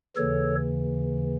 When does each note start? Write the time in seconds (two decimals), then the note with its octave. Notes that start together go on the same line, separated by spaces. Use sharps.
0.16 D#2 C#3 E3 A4 C#5